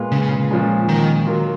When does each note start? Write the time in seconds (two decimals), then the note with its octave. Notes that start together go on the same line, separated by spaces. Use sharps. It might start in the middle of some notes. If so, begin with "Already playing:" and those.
Already playing: A#2 G#3 B3 F4 G#4
0.12 C#3
0.51 A#2 F3 G#3 C#4
0.89 D#3
1.26 F#3 A#3 F4